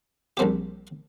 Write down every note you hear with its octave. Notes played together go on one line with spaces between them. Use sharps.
A#1 A#2 G3 C4 G4